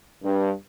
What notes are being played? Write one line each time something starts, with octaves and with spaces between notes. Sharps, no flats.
G2